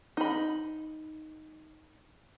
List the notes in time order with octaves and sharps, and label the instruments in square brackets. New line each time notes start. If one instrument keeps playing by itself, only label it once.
[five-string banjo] D#4 B5